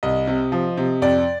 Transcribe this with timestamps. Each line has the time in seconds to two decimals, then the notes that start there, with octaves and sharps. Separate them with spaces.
0.03 C2 D#5
0.27 C3
0.52 F3
0.77 C3
1.02 F2 D5